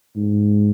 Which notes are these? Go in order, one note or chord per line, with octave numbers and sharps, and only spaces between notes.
G#2